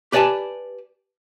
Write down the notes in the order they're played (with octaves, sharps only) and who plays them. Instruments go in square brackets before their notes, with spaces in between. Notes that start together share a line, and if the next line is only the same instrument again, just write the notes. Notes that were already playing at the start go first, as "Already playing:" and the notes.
[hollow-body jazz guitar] G4 B4 D5 D#5 G#5 A5